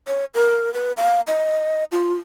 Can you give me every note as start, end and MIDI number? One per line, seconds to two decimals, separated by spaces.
0.07 0.25 73
0.34 0.72 70
0.74 0.92 71
0.97 1.21 77
1.27 1.84 75
1.92 2.13 65